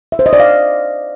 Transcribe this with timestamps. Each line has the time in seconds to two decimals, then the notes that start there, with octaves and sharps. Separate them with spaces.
0.12 E5
0.19 C5
0.26 D#5
0.33 D5
0.40 F5